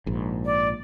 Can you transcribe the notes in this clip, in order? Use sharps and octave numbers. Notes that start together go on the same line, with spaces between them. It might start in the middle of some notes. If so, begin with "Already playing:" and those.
A#1 G#2
D5